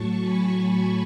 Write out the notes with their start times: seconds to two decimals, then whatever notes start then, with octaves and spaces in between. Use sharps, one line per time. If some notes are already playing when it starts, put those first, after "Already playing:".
Already playing: A2 F#3 A5 C#6
0.21 G#5 B5